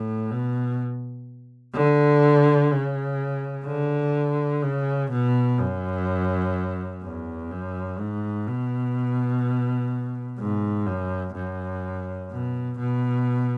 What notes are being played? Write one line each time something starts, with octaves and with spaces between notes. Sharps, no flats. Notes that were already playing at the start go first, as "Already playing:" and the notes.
Already playing: A2
B2
D3
C#3
D3
C#3
B2
F#2
E2
F#2
G#2
B2
G#2
F#2
F#2
B2
B2